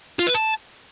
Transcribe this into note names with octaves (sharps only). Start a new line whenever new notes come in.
F4
B4
A5